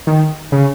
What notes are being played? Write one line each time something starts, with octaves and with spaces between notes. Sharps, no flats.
D#3
C#3